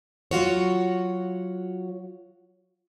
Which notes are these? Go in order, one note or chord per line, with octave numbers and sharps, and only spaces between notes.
F#3 F4 F#4 C#5